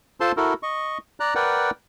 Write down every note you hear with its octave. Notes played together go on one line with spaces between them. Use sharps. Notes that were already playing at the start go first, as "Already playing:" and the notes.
F4 A4 C5 A5 C6
E4 F#4 A4 A#4
D#5 C#6
D5 A#5 F#6
A#4 B4 D5 F#5 G5